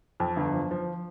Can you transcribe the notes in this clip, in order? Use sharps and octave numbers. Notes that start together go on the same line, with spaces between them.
F2
G1
F3
F3